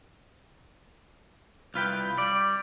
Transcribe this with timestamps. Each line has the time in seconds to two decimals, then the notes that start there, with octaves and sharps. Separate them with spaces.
1.74 C2 F4 B4 G5
2.18 G3 D5